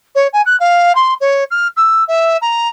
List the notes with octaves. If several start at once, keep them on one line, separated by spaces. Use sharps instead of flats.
C#5
G#5
F#6
F5
C6
C#5
F6
E6
E5
A#5